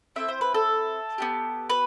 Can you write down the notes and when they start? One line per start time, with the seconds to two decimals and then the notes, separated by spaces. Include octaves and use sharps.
0.16 C4 E4 A4 E5
0.28 C5
0.41 B4
0.54 A4
1.18 B3 D4 G4
1.70 B4